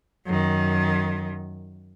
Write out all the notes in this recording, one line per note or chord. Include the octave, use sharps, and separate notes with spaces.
F#2 D#3